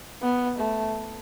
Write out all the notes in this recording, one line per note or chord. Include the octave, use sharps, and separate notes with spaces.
B3
A3